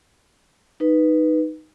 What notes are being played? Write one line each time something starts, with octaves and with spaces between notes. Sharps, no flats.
D#4 B4